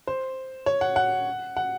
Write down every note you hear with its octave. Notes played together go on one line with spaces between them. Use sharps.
C5
C#5
F#5
F#5
F#5